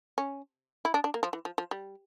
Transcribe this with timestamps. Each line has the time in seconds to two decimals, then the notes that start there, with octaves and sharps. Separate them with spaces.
0.18 C#4
0.85 E4
0.94 D4
1.04 D4
1.14 A#3
1.23 F3
1.33 E3
1.45 F3
1.58 F3
1.71 G3